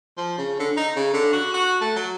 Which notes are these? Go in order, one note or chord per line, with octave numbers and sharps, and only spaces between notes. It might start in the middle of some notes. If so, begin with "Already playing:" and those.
F3
C#3
D3
D#4
C#3
D3
F#4
F#4
A3
F#3